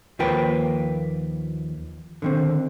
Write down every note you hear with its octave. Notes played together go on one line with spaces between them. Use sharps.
D#2 F3 A#3 B4 G5
D3 D#3 C4